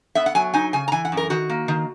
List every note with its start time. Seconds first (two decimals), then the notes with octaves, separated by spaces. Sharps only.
0.15 B3 E5
0.26 F#5
0.35 F#3 G#5
0.54 D#4 G#5
0.73 C#3 G#5
0.88 A#5
0.92 E3 G#5
1.05 F#5
1.12 F#2
1.17 A#4
1.30 D#3 F#4
1.50 A#3
1.68 D#3